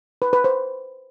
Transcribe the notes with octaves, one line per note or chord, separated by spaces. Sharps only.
B4
B4
C5